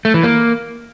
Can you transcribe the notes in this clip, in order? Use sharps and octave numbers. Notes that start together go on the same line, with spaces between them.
A3
E3
A#3